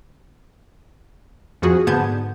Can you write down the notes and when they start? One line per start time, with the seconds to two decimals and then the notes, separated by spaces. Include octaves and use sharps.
1.62 F2 F3 F#4 G#4
1.87 G#2 D3 B3 A5 G6 G#6